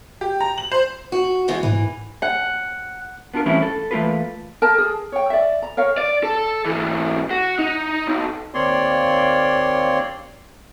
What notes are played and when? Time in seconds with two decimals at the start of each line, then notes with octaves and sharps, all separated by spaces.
0.21 G4
0.41 A#5
0.58 F#7
0.72 C5
1.12 F#4
1.48 B2 E3 G#3
1.63 G#2 E3
2.22 F#5
3.34 B3 D4 F4 F#4 A#4
3.46 E3 G3 A3 C4 C#4 E4
3.62 A4
3.91 E3 A3 A#3 F4 A4 B4
4.62 A#4 A5
4.78 G#4
5.12 C#5 G5
5.30 D5 E5
5.62 A#5
5.77 A#4 C#5 F5
5.98 D5
6.24 A4
6.66 G#2 E3
7.31 F#4
7.59 D#4
8.07 B1
8.54 D#2 A#3 C4 C#5 D5 C6